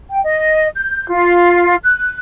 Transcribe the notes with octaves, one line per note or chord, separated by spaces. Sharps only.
G5
D#5
G6
F4
F#6